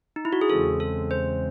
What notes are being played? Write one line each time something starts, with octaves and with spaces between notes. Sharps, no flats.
D#4
E4
F#4
G#4
E2 C#3 G#3 C4 A4
A4
C5